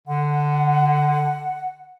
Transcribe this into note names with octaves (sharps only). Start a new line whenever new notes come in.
D3 F#5